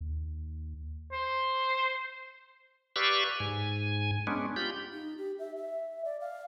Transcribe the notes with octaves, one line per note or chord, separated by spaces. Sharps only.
D#2
C5
G4 B4 D5 F5 C#6 E6
G#2 G#5
G#3 B3 C#4 D4
F4 G4 B5 G6
D#4
G4
E5
E5
D5
F5